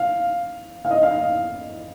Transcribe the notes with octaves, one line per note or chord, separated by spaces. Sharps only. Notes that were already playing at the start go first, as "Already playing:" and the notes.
Already playing: F5
F5
D#5
F5